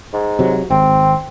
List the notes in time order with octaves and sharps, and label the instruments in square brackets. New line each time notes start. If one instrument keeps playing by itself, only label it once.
[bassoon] G#2
[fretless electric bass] C3 F#3
[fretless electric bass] G#1 [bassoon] C4